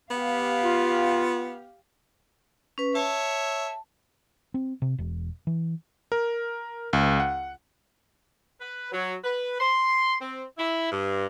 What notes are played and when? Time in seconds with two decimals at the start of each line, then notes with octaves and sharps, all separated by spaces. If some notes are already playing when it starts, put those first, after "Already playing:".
0.10 B3 G4 F5
0.63 F4
2.78 C#4 B4
2.95 C#5 E5 A5
4.54 C4
4.82 C3
4.98 E1
5.47 E3
6.12 A#4
6.93 C#2
7.20 F#5
8.60 B4
8.92 F#3
9.24 B4
9.60 C6
10.21 C4
10.57 E4
10.91 G2